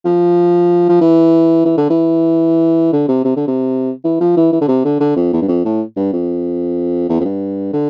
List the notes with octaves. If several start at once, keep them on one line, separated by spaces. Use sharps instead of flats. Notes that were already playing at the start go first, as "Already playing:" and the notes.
F3
F3
E3
E3
D3
E3
D3
C3
C3
D3
C3
E3
F3
E3
E3
D3
C3
D3
D3
F2
E2
G2
F2
A2
G2
F2
E2
F2
G2
D3